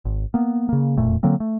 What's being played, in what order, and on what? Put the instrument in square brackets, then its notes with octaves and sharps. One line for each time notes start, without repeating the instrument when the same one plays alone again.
[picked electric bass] G#1
A#3 B3
C#3 A#3
E1 F2 A#2 A3
D3 F#3 A#3 C4
A3